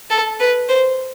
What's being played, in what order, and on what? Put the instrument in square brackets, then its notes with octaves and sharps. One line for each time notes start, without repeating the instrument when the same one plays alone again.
[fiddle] A4
B4
C5